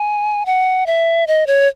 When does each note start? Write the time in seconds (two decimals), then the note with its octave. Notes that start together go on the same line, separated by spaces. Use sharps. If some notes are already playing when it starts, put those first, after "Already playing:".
Already playing: G#5
0.46 F#5
0.86 E5
1.27 D#5
1.47 C#5